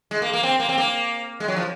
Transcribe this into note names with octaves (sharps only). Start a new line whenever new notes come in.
G#3
A#3
A#3
C4
A#3
C4
A#3
G#3
F#3
F3